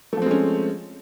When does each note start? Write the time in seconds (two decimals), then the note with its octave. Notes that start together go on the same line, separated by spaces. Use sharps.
0.13 A3
0.17 F3
0.22 C4
0.26 G#3
0.31 C#4